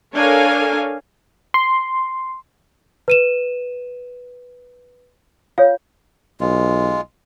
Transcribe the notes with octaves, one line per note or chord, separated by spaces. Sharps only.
D4 A4 A#4 C#5 F5 G#5
C6
B4 D#7 E7
F4 C#5 F5
B1 G#3 F4